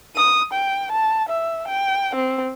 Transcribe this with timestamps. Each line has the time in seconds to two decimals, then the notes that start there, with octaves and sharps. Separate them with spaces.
0.16 D#6
0.53 G5
0.92 A5
1.29 E5
1.67 G5
2.15 C4